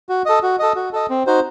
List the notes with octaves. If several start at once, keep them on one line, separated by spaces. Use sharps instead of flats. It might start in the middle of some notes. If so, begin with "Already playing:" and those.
F#4
A4 D#5
F#4
A4 D#5
F#4
A4 D#5
C4
D#4 F#4 C5